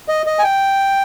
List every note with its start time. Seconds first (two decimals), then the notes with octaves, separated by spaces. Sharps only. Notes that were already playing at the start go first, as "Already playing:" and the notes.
0.08 D#5
0.26 D#5
0.39 G#5
0.44 G5